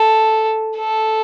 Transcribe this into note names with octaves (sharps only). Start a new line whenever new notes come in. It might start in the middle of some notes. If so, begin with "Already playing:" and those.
Already playing: A4
A4